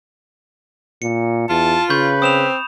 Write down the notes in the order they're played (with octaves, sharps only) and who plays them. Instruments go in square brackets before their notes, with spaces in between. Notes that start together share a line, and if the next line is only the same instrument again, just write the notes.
[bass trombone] A#2 [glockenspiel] C#7
[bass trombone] E2 [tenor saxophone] F4 [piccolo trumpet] A5
[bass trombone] C#3 [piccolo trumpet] B4 [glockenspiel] B5 C#6 G6
[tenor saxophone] C4 [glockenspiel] D#6 E7 F7